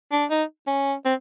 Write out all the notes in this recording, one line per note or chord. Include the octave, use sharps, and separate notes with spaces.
D4
D#4
C#4
C4